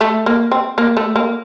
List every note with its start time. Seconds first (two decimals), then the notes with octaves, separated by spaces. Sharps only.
0.01 A3
0.26 A#3
0.51 C4
0.78 A#3
0.97 A3
1.16 A#3